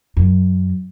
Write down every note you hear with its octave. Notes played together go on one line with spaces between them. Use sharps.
F#2